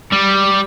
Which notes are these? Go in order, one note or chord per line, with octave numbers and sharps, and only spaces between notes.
G3